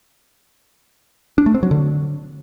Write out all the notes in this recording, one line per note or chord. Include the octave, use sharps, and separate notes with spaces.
D4
A3
C4
F#3
D3